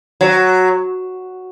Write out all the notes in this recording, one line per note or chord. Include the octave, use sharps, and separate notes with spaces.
F#3